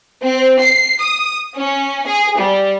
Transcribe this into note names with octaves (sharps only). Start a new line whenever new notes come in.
C4
C7
D#6
C#4
G#4
G3